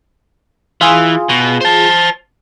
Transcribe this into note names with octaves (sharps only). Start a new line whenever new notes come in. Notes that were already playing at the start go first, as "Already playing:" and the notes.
E3 F4 G#4
B2
C5 A5